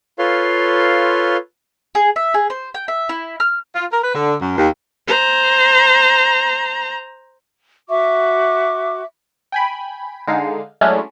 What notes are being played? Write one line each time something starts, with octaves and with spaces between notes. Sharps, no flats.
F4 A4 B4 C#5 F5 C6
G#4
E5
G#4
C5
G5
E5
E4
F6
F4
A#4
B4
D3
F#2
D#2
C5 A#5
F#4 E5 C#6 D6
G5 G#5 B5
D3 G#3 D#4 F5
F#3 G#3 A3 C#4 D4 E4